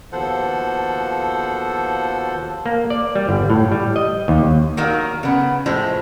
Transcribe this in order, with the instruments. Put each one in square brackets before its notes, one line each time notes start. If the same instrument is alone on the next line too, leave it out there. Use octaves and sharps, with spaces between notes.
[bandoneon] D#2 B2 F3 A4 C5 F#5
[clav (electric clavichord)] A#3
D5
G3
G1
A2
G3
D#5
D#2
[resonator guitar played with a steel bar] D#3 F#3 A#3
C#3 B3
A2 F3 G#3